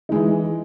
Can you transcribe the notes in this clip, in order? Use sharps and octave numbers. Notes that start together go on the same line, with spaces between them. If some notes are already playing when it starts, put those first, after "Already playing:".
E3 G#3 D#4